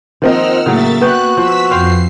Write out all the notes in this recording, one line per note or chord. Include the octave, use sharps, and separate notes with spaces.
D#3 F3 A#3 C4 D#5 F#5 E6 F6
A2 C#3 F#3 A#3 E5 A6
B3 F#4 B4 G5 F#6
F3 E6 B6
F2 C5 F5 G5 C7